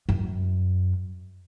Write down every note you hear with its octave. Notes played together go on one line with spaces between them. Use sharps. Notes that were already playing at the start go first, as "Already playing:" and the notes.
F#2